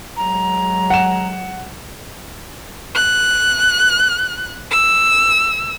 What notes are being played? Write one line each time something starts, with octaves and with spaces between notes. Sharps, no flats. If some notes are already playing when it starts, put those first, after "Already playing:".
F#3 G#3 A#5
F#5 E7
F#6
E6